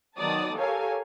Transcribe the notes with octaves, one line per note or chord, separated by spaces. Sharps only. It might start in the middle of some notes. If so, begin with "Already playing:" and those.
D#3 F#3 B3 D5 A5 D#6
G4 A4 A#4 C#5 F5 G#5